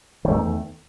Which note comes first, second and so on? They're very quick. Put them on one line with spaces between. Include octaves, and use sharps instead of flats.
D#3 A3 E2